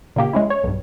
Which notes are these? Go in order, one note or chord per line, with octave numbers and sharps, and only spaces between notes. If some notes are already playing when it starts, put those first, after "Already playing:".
A#2 C#3 A#3 G4
G#3 C#4 E4
C#5
B1 G2